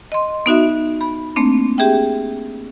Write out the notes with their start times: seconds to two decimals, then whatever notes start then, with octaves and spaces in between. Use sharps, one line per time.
0.12 D#5 C6
0.46 B3 D#4 F#4 E5
1.01 B5
1.36 A3 A#3 C4 D4
1.78 G4 G#4 E5 G5